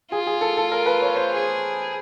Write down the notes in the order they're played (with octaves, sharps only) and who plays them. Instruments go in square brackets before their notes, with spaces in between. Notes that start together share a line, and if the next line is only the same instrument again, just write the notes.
[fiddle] F4 [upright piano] G#4
[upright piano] G#4
A4
A4
A#4
B4
C#5
C5
[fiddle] G#4